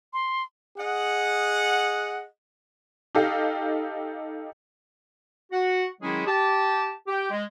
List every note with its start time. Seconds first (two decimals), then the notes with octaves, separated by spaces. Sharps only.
0.13 C6
0.77 G#4 D#5 F#5
3.15 D#4 G4 A4 D#5 F5
5.52 F#4 F#5
6.01 D#3 F#3 G#3 C#4 E4 G#4
6.26 G4 A5
7.08 G4 G5
7.31 G#3